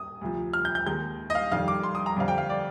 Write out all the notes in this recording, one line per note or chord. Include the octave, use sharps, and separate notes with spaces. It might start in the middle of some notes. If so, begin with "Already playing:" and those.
Already playing: D#6
D2 C3 F3
F6
G6
G6
D#2 D#3 G#3 D#4 G6
D#5
F5
F2 D#3 G3 F5
D6
C6
D#6
A#5
F2 D3 G3 C4 F5
G5
F5
D5